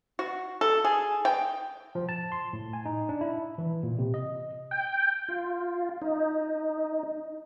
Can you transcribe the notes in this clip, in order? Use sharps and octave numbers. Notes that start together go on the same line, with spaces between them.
F#4
A4
G#4
G5
F3
A5
C6
A2
G#5
D#4
D4
E4
E3
A#2
C3
D#5
G5
F4
D#4